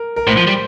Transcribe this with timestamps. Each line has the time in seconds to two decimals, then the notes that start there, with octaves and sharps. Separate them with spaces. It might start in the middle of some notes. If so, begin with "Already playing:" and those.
Already playing: A#4
0.16 A#4
0.27 A2 C5
0.37 F3
0.47 G3